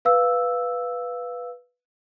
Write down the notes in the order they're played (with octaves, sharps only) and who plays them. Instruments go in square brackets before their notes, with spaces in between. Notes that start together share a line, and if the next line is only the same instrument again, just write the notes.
[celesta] B4 F5 E6